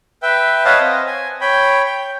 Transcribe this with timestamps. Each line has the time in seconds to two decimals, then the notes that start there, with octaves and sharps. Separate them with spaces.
0.23 B4 E5 G5
0.65 B4 C#5 D#5 F5 F#5 A5
0.80 C4 D#5
1.07 G#5
1.41 C#5 G5 B5
1.86 G5